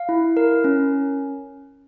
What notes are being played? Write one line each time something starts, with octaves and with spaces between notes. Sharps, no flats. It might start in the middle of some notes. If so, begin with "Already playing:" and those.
Already playing: F5
E4
A#4
C#4